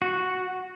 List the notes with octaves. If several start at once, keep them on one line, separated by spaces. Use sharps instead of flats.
F#4